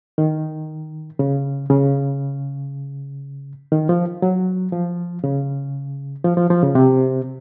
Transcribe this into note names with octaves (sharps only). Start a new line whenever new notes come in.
D#3
C#3
C#3
D#3
F3
F#3
F3
C#3
F3
F3
F3
C#3
C3